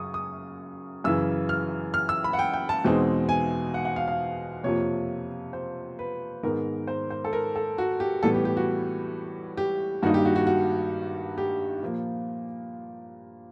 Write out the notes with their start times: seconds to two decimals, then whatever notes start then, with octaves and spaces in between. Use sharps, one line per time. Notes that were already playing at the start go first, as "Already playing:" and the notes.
Already playing: F#2 C#3 C#6 D#6
0.14 D#6
1.04 F#2 C#3 E3 E6
1.49 F6
1.94 F6
2.09 E6
2.24 B5
2.33 F#5
2.39 G5
2.54 G5
2.69 A5
2.84 E2 B2 G#3 C4 D#4
3.29 G#5
3.74 F#5
3.85 F#5
3.96 F5
4.08 F5
4.64 F2 C3 F3 A#3 C#5
5.53 C5
5.99 B4
6.43 G#2 D#3 G#3 B3 A#4
6.87 C5
7.10 C5
7.25 A4
7.33 A#4
7.56 A4
7.78 F#4
8.00 G4
8.23 A2 E3 G3 B3 A4
8.34 G4
8.45 G4
8.57 F#4
9.57 G4
10.02 G2 D#3 G3 A#3 D#4 F#4
10.14 G4
10.25 F#4
10.36 F#4
10.47 F#4
11.38 G4
11.82 A#2 F3 A#3